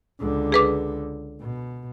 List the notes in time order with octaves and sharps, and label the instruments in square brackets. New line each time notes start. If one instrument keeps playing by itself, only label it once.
[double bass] C#2 D3
[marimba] G#4 B4 D6
[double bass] B2